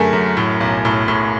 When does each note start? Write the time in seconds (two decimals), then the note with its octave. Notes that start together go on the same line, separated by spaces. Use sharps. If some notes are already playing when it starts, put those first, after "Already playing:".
Already playing: F#2 D3 A3 G#4 A#4
0.13 F#2
0.37 A2
0.60 B1
0.85 A2
1.08 A2